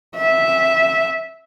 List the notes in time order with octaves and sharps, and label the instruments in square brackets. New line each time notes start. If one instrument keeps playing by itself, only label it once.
[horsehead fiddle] E5